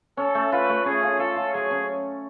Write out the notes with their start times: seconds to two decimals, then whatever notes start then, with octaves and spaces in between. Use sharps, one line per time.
0.17 C#4 A4
0.35 A3
0.52 F4 B4
0.69 A3
0.85 C#4 G#4
1.03 F4
1.19 F4 A4
1.36 F4
1.53 F#3 G#4
1.71 C#4